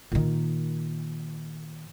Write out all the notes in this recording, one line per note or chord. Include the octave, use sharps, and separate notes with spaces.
A#2 D#3